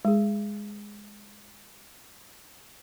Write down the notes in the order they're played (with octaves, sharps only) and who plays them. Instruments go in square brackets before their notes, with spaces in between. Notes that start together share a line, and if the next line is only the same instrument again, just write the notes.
[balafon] G#3 G#4